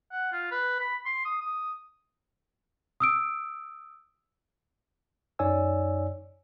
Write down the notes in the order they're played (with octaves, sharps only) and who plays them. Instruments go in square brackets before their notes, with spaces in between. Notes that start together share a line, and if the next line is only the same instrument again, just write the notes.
[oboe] F#5
F4
B4
B5
C6
D#6
D#6
[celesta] D#6 E6 D7
[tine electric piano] F#2 D#4 C#5 D5 G#5 E6